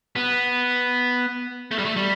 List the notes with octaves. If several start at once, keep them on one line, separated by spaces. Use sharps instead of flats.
B3
A3
G3
A3
G3